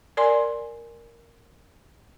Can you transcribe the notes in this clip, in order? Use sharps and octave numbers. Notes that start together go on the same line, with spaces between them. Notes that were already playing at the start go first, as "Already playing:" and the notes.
A#4 D5 G#5 C6